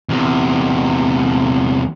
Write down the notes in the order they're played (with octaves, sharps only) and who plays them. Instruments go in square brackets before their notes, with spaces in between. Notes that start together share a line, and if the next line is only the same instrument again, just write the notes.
[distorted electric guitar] E2 C3